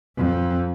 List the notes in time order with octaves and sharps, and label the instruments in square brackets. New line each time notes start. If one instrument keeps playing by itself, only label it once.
[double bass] F2